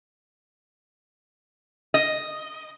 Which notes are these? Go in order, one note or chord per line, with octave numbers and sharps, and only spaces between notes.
D#5